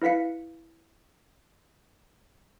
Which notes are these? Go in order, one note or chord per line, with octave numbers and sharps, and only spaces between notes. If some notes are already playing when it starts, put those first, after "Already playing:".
E4 B4 F5 B6 C#7